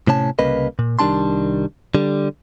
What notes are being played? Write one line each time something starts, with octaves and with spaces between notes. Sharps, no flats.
A2 C3 C#4 A5
C2 C#3 A#3 B4 D#5
A#2
C2 D#3 G3 D4 A5 C6
D3 G3